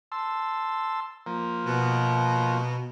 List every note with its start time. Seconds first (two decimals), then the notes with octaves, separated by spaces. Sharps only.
0.12 A5 C6 E6
1.26 F3 A#3
1.67 B2